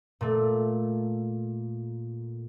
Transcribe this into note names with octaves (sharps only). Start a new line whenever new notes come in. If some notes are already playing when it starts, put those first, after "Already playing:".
A#2 A3